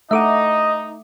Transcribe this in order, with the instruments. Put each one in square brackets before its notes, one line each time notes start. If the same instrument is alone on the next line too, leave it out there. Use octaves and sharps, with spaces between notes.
[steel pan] A3 A4 F#5 [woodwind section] D#4 [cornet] D#5 [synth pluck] E5 D6 D#6